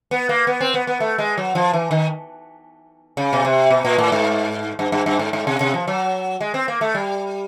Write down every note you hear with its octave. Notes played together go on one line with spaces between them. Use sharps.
B3
A#3
B3
C4
B3
B3
A3
G#3
F#3
F3
E3
D#3
C#3
B2
C3
B2
A#2
A2
G#2
G2
G2
G2
G#2
G#2
C3
C3
F3
F#3
G#3
C4
A#3
A3
G3